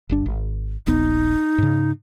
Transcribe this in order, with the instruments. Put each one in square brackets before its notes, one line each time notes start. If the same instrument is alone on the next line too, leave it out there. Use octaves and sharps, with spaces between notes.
[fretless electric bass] G1 G2 D4
G#1
[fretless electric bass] D#1 A#1 B3 [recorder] D#4
[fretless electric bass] G#2 C#3